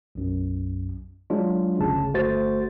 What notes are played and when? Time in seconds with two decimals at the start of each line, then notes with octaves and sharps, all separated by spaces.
0.15 B1 F#2
1.30 F#3 G#3 D4 F4
1.79 G1 D2 C#3 A5
2.14 G1 A3 F#4 C5 A6